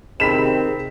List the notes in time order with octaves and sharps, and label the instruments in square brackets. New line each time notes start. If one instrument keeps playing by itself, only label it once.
[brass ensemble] C3 C4 [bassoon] D#3 [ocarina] G#4 [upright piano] B5 B6 E7